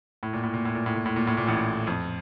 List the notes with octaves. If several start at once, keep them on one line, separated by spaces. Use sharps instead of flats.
A2
A#2
A2
A#2
A2
A#2
A2
A#2
A2
A#2
A2
A#2
A1 A2
F2